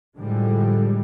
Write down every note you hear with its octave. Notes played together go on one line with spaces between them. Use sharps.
A2 D3 F3 G3 G#3